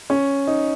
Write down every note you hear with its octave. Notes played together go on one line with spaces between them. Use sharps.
C#4
D#4